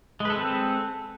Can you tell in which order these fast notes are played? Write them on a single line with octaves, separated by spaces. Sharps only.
G#3 B4 A4 C4